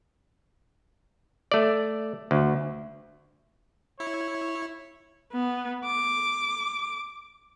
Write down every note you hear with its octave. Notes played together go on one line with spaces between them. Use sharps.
A3 D5
D2
E4 C#5
B3
D6